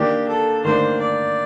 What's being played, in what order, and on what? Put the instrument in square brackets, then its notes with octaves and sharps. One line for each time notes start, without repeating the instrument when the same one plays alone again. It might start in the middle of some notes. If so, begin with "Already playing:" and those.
Already playing: [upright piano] D#3 A#3 D4 [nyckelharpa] G4
[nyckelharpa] A4
[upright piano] D#3 A#3 D4 [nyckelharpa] C5
[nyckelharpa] D5